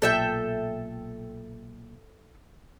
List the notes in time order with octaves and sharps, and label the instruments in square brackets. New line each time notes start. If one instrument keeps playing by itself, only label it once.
[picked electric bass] B1 A#2 [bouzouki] A4 E5 G5